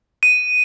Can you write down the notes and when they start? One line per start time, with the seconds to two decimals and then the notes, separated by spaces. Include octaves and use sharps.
0.23 D#7